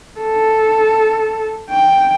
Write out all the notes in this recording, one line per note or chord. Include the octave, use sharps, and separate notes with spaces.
A4
G5